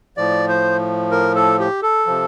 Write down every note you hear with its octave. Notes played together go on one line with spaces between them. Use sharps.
A2 F3 D5
C5
A#4
A4
G4
A4
C3 F3